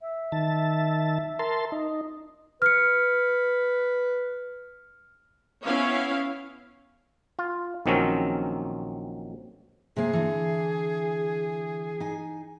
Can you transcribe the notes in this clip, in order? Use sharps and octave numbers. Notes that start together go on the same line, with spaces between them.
E5
D#3 A5
A#4 A5 C6
D#4
B4 F6 C#7
B3 C#4 E4 C#5 F5
F4
A#1 D#3 F#3 C4 C#4 A#4
C3 A#3 G#4
D3 E3
D#4 G#5